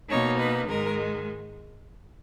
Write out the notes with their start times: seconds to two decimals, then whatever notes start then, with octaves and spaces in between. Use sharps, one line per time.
0.09 B2 A#3 D#4 C#5
0.39 B4
0.68 G#2 D#3 G#3 A#4